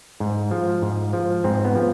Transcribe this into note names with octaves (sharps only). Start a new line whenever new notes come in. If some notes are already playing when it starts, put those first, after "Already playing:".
G#2
F3
G#2
F3
G#2 C4
B3
F3